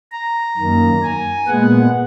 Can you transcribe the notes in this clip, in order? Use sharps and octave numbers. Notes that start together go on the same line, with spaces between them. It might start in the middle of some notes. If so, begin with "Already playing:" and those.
A#5
F#2 D#3 A#3
G#5
A#2 G#3 B3 F#5